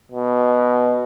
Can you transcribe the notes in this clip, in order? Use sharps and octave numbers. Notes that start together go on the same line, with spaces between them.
B2